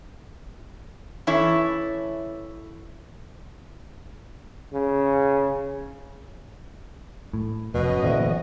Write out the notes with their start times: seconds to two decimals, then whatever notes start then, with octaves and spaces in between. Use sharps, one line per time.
1.27 E3 C#4 E4 A4 C#5
4.73 C#3
7.34 A2
7.74 F1 F#2 B2 C#4 D#5
8.04 D2 A#2 E3